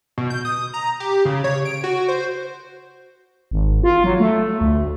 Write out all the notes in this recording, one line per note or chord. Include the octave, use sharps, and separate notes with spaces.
B2
G6
D#6
A#5
G4
C#3
C#5
D7
F#4
C5
G#1
F4
F#3
A3
D2